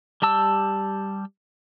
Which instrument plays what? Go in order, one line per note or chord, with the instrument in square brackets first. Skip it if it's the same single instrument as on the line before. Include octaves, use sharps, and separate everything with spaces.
[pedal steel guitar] G3 G4 A5 E6